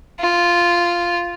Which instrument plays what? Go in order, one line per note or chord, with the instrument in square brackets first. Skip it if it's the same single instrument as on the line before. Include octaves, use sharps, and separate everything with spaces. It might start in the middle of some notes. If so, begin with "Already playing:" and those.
[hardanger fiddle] F4